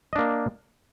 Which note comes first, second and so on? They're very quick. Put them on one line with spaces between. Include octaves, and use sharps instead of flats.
D#5 D4 A#3